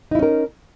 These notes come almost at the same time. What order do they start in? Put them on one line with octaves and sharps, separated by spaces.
D#4 E4 C#4 A#4